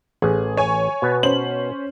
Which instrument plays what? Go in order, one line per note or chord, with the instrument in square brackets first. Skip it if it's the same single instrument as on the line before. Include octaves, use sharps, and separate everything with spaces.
[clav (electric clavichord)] A1 [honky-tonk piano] G#4
[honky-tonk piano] C#5 G#5
[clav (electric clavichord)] B2 B3
[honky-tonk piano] C#4 C5 F#7